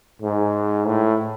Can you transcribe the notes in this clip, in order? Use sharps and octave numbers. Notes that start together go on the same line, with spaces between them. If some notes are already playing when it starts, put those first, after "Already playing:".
G#2
A2